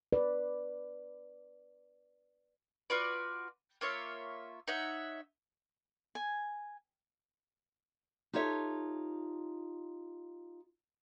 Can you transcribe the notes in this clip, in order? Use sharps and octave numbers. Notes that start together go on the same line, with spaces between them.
B4 D5
F4 F#4 B4 D5
A#3 F4 C#5 E5
D#4 C#5 E5 F#5
G#5
D#4 F4 G4 A4 C#5 E5